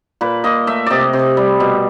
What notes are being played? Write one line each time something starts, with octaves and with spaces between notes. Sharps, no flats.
A#2 B4
A#2 D#5
A3 E5
C3 D5 D#5
C3
G3
B2